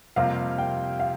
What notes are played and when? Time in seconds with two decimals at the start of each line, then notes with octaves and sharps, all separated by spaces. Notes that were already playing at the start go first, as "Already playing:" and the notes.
0.16 F2 C3 G3 A#3 F4 F5
0.58 G5
1.00 F5